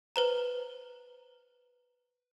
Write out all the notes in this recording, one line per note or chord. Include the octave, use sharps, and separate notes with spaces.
B4 C5 A#5